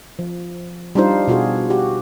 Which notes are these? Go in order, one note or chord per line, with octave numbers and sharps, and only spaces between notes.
F3
G3 D4 D#4 F4 C5
B2 F4 F#4 G#4
F#4 G4